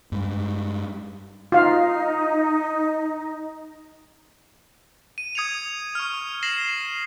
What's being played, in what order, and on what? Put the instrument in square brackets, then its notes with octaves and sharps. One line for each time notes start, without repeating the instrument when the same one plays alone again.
[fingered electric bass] G2 G#3
[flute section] D#4 [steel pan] F4 F5
[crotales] D#7
D#6 G#6 C#7 D#7 F7
C#6 F6
A#6 C7 E7 F#7